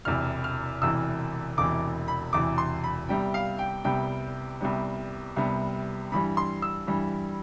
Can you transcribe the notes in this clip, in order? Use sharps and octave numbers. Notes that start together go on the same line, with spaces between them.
E1 E2 C3 E3 F6
F6
E1 E2 C3 E3 E6
E1 E2 C3 E3 D6
B5
E1 E2 C3 E3 D6
C6
B5
C2 C3 G3 B3 G5
F5
G5
C2 C3 G3 B3 G5
C2 C3 G3 B3
C2 C3 G3 B3
G2 E3 G3 B5
C6
E6
G2 E3 G3